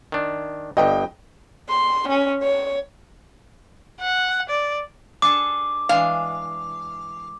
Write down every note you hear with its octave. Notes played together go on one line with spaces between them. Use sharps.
D#3 D4
G1 G2 D#5 G5
C6
C#4
C#5
F#5
D5
D4 G#4 A4 D6
E3 G#3 D4 F5